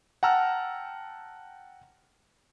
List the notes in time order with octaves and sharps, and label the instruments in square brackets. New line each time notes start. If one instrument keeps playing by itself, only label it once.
[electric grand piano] F#5 G5 A5 A#5 E6 F6